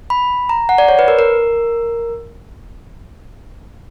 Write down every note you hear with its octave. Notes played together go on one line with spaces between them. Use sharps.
B5
A#5
F#5
D5
C#5
B4
A#4
A#4